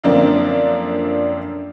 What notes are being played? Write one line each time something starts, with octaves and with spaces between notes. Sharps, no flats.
F#2 D3 F3 A#3 C4 D4